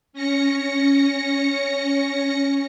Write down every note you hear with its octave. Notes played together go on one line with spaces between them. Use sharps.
C#4 A#6 C#7